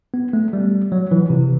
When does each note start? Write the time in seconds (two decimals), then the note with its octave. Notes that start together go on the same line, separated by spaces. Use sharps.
0.14 B3
0.33 A3
0.53 G3
0.92 F#3
1.11 E3
1.30 C3